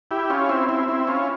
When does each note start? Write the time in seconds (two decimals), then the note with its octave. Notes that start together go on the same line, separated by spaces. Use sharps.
0.11 E4 G4
0.30 C#4 F4
0.49 C4 E4
0.68 C4 E4
0.88 C4 E4
1.07 C#4 F4